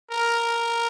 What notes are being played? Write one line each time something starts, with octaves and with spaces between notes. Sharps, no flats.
A#4